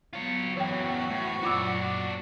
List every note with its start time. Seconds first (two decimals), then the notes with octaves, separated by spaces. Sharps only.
0.13 F#3 B3 F4 C#5
0.57 F#2 E3 F#4 C#5 G5
1.10 A2 C5 A#5 D6
1.43 F#2 A#2 F#3 D4 F4 C#5 D6 E6